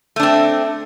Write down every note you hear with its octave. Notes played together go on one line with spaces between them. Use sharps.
A3 C4 D4